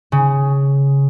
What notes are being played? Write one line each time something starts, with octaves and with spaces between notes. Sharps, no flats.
C#3